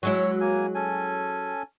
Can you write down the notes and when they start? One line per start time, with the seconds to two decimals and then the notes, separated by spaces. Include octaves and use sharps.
0.03 F#3 G#3 E4 C#5
0.41 A#3 G#5
0.75 C#4 A4 G#5